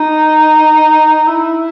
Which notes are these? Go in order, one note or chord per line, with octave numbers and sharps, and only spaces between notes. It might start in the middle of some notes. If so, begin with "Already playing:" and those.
Already playing: D#4
E4